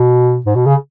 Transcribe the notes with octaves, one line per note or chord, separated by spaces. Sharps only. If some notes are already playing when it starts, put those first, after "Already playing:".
Already playing: B2
G#2
B2
C#3